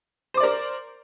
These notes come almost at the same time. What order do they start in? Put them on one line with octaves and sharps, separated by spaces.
C5 D6 D5 A#4